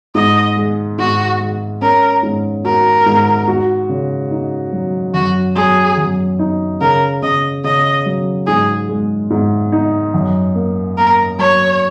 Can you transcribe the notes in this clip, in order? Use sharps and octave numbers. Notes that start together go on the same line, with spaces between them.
G#2 D#5
G#3
G#2 F#4
G#3
C#4 A#4
G#2
F#4 A#4
G#2
F#4
C#3
D#4
F#3
F#2 F#4
F#3 G#4
F#2
D#4
C#3 A#4
C#3 D#5
C#3 D#5
F#3
G#2 G#4
G#3
G#2
D#4
F#2
A#3
A#3 A#4
F#3 C#5